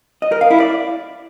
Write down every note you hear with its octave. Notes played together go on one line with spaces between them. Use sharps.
D#5
A#4
F5
E4
D5